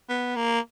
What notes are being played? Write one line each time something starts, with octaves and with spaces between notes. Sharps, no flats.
B3
A#3